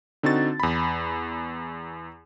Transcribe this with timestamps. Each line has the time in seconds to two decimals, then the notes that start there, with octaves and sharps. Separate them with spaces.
0.23 D3 C4 D#4 F#4 A6
0.60 E2 B5